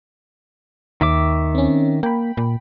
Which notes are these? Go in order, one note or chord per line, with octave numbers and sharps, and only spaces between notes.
D#2 D#3 E5 D6
C4 C#4
A#3 G5 B5
A#2